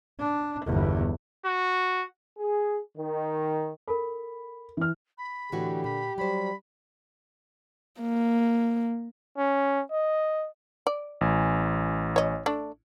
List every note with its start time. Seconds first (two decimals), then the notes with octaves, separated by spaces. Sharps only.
0.19 D4
0.65 G1 E2
1.46 F#4
2.38 G#4
2.97 D#3
3.88 A4 A#4 B5
4.77 E3 F6
5.18 B5
5.52 A2 D3 E3 F#4 G4
5.84 A#2 B5
6.18 F#3 G3 C5 B5
8.02 A#3
9.38 C#4
9.91 D#5
10.87 D5
11.21 A1 G#5
12.16 C#5 D#5
12.46 A3 D4